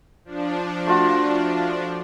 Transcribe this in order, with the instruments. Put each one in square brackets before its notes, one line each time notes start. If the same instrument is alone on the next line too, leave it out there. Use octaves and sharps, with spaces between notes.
[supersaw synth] F3 D4
[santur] A3 F4 F#4